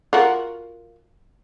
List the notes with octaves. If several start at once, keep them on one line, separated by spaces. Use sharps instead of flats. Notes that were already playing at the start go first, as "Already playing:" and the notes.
F4 F#4 A#4